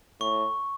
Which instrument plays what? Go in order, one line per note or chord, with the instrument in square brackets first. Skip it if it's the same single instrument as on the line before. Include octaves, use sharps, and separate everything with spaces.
[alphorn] A2 [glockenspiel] C#6